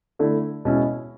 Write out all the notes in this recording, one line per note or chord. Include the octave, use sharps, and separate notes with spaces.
D3 A3 E4
B2 G#3 C#4 E4